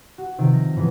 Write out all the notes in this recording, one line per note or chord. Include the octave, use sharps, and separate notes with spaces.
F#4
C3 D#3 F3
A#6
A2 E3 B3